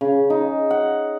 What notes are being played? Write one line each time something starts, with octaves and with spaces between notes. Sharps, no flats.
C#3
D#4
F#5